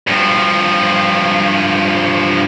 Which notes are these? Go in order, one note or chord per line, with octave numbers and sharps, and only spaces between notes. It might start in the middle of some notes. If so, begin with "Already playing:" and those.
G2 F3